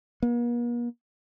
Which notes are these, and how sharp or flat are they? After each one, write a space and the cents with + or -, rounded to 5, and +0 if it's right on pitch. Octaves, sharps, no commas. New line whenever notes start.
A#3 +45